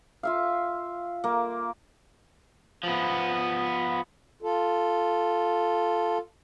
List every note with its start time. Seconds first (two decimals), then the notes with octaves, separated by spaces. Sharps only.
0.23 F4 E5 F5
1.24 A#3
2.83 F3 B3
4.42 F4 A4